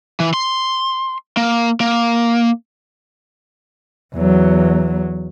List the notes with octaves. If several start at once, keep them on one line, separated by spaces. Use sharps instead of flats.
E3
C6
A#3
A#3
E2 F#3